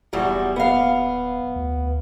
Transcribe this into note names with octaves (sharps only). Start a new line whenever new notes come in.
D1 E2 F#3 G3
B3 F5
D2